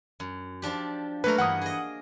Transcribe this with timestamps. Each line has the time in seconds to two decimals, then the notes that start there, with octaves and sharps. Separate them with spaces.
0.20 F#2
0.62 F3 D4 G4
1.24 F#3 A3 A#3 A#4 B4
1.38 G2 E3 F#5 D#6
1.61 G#4 D#5